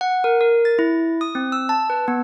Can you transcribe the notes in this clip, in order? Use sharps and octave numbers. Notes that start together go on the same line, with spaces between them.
F#5
A#4
A#4
A6
E4
D#6
C4
E6
A5
B4
B3